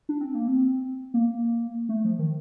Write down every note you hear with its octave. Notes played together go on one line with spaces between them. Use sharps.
D4
C4
A#3
C4
A#3
A3
F3
D#3